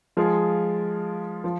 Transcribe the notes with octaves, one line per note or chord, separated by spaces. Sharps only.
F3 G#3 F4 G#4
F3